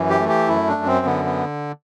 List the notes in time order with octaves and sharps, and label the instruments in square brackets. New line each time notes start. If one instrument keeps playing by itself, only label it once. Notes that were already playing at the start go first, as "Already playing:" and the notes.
Already playing: [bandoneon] F#2 E3
G4
A3
G4
F#2 E4
D4
F#2
C4
D3 B3
B3